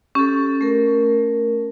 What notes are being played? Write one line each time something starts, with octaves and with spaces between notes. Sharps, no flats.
C#4 G4 A4
A3 A#4